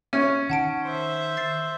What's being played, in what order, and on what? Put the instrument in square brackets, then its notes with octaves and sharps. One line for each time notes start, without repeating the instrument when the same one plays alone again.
[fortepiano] C#4 [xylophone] E5
[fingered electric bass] D#3 [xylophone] F#5 A5 D7
[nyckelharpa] C5 E5
[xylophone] A6 C7